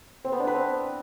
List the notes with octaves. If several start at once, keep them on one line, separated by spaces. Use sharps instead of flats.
C4
B3
D4
B4
C4